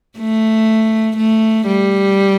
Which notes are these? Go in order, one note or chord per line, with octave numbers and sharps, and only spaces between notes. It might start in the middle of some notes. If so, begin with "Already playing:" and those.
A3
A3
G3